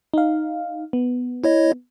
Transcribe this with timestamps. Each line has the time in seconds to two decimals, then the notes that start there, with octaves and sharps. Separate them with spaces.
0.14 D#4 F5
0.93 B3
1.44 E4 C#5 D#5